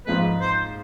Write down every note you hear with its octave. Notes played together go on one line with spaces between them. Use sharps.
G#2 F3 G#3 B4
C5